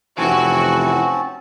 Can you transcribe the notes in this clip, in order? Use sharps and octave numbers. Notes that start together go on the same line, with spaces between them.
F1 E3 C4 C#4 F#4 A5